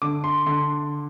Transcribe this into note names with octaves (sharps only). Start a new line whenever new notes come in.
D3 D6
C6
D3 C6